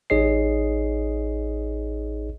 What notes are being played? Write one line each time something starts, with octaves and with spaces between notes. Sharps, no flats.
A1 D#4 G#4 C#5 D#5 C7